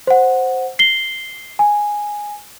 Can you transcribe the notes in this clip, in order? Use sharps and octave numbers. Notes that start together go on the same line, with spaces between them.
C5 F#5
C7 G7
G#5